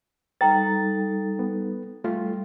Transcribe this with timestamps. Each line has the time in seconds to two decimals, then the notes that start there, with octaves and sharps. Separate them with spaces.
0.41 G3 D#4 A4 B4 G5 A#5 A6
1.39 B3
2.04 G3 A3 F4